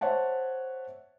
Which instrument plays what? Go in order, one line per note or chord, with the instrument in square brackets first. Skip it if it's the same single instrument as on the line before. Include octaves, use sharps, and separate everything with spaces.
[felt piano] C5 C#5 E5 F#5 A5